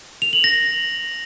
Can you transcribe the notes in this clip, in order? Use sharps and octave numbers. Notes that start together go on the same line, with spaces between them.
F7
F#7
A#6